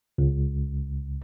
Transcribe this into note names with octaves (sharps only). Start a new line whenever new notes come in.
C#2